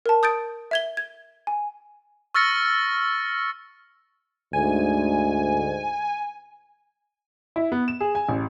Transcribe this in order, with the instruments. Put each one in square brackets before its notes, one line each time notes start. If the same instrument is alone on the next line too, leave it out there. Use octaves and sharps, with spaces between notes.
[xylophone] A#4 A5
D#6 G6 A6 D7
E5 G#6 G7
G#6
G#5
[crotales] C#6 E6 F6 A6 A#6 C#7
[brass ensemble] D2 G#2 [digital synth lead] G#5
[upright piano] E4
B3
E7
G#4
G#5
A1